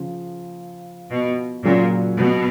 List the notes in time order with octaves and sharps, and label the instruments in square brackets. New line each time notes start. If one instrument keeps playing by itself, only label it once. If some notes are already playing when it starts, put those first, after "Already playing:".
Already playing: [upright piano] C#3 F3
[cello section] B2
[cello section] A#2 [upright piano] C#3 F#3 C#4
[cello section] B2